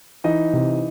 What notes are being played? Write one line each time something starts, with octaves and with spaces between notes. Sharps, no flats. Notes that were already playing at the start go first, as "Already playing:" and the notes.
E3 D#4 D#5
C3